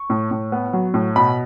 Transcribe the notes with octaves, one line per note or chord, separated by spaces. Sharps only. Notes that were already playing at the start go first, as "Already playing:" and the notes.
Already playing: C#6
A2
A2
B3
F#3
A2
B2 B5